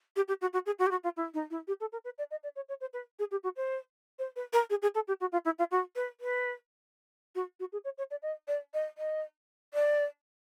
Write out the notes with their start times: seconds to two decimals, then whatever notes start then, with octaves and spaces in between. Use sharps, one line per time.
0.16 G4
0.28 G4
0.41 F#4
0.53 F#4
0.66 G#4
0.78 F#4
0.86 G4
0.91 F#4
1.03 F4
1.16 E4
1.34 D#4
1.50 E4
1.67 G4
1.80 A4
1.92 A#4
2.04 B4
2.18 D5
2.30 D#5
2.43 D5
2.55 C#5
2.68 C#5
2.80 C5
2.93 B4
3.19 G#4
3.31 G4
3.43 F#4
3.56 C5
4.18 C5
4.36 B4
4.52 A#4
4.70 G#4
4.82 G#4
4.94 A4
5.07 G4
5.20 F#4
5.32 F4
5.45 E4
5.58 F4
5.71 F#4
5.95 B4
6.20 B4
7.35 F#4
7.59 F#4
7.72 G#4
7.84 C#5
7.98 C#5
8.10 D5
8.22 D#5
8.47 D5
8.73 D#5
8.97 D#5
9.74 D5